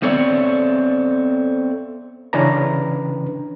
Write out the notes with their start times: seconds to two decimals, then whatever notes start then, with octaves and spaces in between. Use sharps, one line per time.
0.02 B3 C4 A4 C#5 D5 E5
2.33 C#3 E3 C#4 D4 B4 A#5